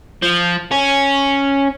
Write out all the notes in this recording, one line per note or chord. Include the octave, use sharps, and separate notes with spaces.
F3
C#4